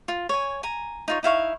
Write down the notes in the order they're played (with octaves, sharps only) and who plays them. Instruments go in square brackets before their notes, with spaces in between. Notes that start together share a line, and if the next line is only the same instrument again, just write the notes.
[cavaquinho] F4
C#5 G#5
G#5 A#5
D#4 F4 C#5
D#4 E4 F5 C#6